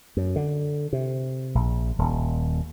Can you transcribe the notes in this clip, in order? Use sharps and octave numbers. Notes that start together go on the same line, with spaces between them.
F#2
D3
C3
A#1
D#1